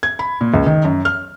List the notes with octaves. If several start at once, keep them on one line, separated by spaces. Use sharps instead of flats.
G#6
B5
A#2
C#2
D#3
F#2
F6